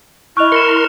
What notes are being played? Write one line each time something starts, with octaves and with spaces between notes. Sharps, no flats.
E4 D#5 C#6 F6 F#6 F7
A#4 C6 C#7 E7